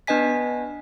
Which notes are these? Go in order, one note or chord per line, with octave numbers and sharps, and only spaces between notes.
B3 D4 B4 D#5 G#5 B6